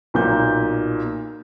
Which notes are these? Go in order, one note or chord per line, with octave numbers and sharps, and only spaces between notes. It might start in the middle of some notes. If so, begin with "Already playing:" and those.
B1 A#2 G6